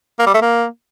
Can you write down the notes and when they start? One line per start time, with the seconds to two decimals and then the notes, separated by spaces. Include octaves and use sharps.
0.19 A#3
0.26 G3
0.34 A3
0.42 A#3